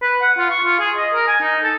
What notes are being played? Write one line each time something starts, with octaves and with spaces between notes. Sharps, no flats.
B4
F#5
F4
C#6
F4
G#4
D#5
A#4
G#5
D#4
A4